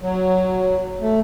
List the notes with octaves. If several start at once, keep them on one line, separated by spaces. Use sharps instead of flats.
F#3
A3